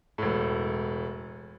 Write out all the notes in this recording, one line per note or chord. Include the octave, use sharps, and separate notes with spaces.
E1 A2